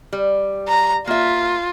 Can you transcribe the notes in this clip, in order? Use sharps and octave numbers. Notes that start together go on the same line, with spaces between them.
G3
A#5
A#3 F4 E5